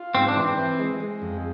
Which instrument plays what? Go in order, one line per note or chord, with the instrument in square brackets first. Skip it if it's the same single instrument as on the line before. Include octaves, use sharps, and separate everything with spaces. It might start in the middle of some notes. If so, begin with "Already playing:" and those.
Already playing: [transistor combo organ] F4
[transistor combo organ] G#2 [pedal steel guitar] C4
[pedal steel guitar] D4
[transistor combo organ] E3
[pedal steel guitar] C4
[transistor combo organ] E3
G#3
G#3
F2